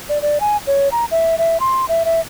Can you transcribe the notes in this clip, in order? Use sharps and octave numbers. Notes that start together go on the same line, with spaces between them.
D5
D5
G#5
C#5
A#5
E5
E5
C6
E5
E5